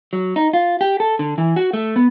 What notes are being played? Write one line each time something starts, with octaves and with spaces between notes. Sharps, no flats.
F#3
D#4
F4
G4
A4
D3
E3
F#4
A3
B3